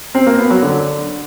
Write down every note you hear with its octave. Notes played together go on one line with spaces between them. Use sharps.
C4
A#3
B3
F#3
D3